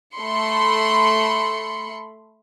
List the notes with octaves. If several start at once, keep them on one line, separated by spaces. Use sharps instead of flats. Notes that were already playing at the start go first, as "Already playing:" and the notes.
A3 B5 C6 C#7